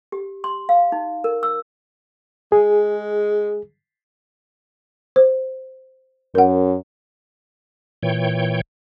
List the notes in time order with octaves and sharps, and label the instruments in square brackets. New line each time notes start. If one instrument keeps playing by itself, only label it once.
[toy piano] G4
C6
F5
D#4
A#4
E6
[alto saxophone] G#3 [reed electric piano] G#4
[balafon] C5
[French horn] F#2 [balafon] A#4 F#5
[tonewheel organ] A#2 E3 C#5 G5